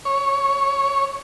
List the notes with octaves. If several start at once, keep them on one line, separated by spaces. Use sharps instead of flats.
C#5